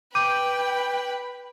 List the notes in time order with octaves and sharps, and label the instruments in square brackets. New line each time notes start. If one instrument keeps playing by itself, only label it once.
[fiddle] B4 B5 [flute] G5 [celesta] D6 G6 D#7